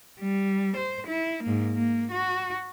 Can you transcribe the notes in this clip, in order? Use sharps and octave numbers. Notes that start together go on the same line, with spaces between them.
G3
C5
E4
G#2 A#3
A#3
F#4